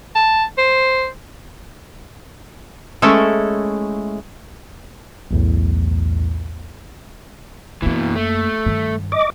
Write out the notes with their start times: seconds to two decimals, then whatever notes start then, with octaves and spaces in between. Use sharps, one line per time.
0.15 A5
0.58 C5
3.02 G#3 A3 C#4 E4 A4
5.31 B1 E2 A2
7.82 F#2 B2 E3 A#3
8.16 A3
8.66 G2 D#3
9.12 D#5 D6